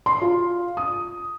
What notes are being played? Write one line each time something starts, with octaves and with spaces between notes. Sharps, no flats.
C6
F4
D#6